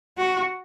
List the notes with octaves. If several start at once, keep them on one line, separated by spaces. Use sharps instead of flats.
F#4